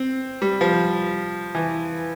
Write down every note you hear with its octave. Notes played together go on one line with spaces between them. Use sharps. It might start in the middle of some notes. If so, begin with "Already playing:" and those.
Already playing: C4
G3
F3
E3